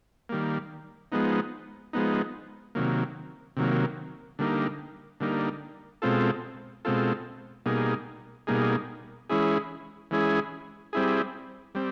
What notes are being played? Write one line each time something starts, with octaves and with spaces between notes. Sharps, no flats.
D#3 G3 A#3
F3 G#3 B3 D#4
F3 G#3 B3 D#4
C3 D#3 F#3 A#3
C3 D#3 F#3 A#3
D3 G3 A#3 D#4
D3 G3 A#3 D#4
B2 G#3 C4 F4 A4
B2 G#3 C4 F4 A4
B2 G3 A#3 D#4 G#4
B2 G3 A#3 D#4 G#4
E3 G#3 C#4 E4 G#4
E3 G#3 C#4 E4 G#4
G3 C4 E4 G#4
G3 C4